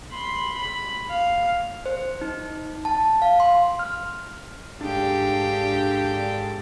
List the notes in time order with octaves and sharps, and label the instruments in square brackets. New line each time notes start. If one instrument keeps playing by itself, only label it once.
[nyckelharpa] B5 C6
B5
F5
[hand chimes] C5
D#4
A5
F5
C6
F6
[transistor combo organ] G#2 A4 A5 [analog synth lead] D4 [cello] G4 [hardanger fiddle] F5 G5